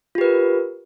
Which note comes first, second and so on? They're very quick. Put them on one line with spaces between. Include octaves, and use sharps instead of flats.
F4 G4 B4 A#4